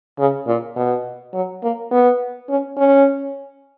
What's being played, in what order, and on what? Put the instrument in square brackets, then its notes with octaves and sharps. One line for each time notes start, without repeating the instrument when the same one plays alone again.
[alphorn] C#3
A#2
B2
F#3
A#3
B3
C#4
C#4